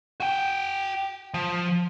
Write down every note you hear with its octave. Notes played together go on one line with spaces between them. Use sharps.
F#4 G5
F3